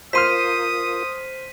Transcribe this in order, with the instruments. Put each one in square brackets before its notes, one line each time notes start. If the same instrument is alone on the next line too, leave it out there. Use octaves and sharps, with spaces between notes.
[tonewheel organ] F4 A#4 [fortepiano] C5 C6 F6 [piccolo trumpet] D#6 [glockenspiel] B6 D#7